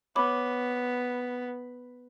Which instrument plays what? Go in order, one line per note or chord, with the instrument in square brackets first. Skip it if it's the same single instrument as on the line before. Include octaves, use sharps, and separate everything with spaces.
[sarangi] B3 [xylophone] C#5 B5 D6